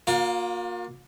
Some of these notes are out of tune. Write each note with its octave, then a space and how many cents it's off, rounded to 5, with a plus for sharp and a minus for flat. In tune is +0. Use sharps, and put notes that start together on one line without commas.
A#3 +10 F4 +45